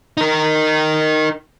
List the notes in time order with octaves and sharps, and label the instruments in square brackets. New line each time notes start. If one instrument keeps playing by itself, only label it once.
[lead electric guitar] D#4 A#4